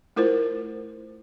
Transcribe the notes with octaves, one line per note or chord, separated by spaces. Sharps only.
A3 E4 F4 A#4 C5